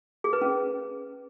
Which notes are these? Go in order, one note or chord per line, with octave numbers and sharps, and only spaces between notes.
G#4
B4
C#4